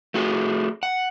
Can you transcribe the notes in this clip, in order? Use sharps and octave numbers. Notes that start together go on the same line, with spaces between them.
A3 F#4 G#4
F#5